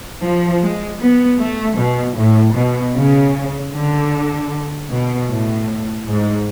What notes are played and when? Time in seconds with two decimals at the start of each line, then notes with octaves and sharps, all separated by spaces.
0.23 F3
0.62 G#3
1.01 B3
1.40 A3
1.79 B2
2.18 A2
2.56 B2
2.96 C#3
3.73 D3
4.90 B2
5.29 A2
6.07 G#2